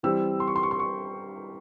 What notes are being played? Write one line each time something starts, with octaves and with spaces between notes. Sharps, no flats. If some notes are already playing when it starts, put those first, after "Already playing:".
E3 G3 C4 E6
C6
C#6
C6
C#6
C6
C#6